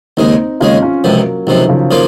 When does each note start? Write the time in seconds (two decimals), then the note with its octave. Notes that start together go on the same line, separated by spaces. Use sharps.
0.17 D#2 C#3 G#3 C4 D#4
0.60 D#2 C#3 G#3 C#4 F4
0.82 C#4 F4
1.04 C#2 C3 F3 F#3 A#3
1.47 C#2 C3 D#3 F3 F#3
1.69 C#3 F3
1.91 C#3 F3 A#3 F4